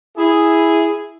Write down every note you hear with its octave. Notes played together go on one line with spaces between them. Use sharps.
E4 G#4